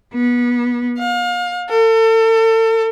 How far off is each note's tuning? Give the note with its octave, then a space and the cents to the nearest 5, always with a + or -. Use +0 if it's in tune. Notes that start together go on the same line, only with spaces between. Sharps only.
B3 -25
F5 +35
A4 +35